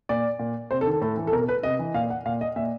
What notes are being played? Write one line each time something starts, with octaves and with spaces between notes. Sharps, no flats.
A#2 D5
A#2
C3 C5
A4
D#3
A4
A2 A4
E3
A4
B2 A#4
B4
C3 D#5
E3
A#2 F5
F#5
A#2 F5
D#5
A#2 E5